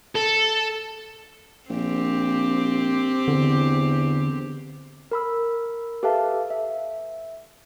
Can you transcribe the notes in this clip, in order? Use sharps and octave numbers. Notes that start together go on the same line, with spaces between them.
A4
A#1 C4 G4
E2 D3
A#4 B5 E6
G4 A4 B4 E5 F5 A5
E5